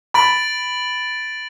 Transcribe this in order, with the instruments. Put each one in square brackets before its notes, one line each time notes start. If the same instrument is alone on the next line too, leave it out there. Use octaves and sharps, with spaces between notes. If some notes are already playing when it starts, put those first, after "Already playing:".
[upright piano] B5 [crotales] A6 D7 F#7